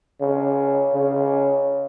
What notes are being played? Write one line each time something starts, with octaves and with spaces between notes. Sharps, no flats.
C#3
C#3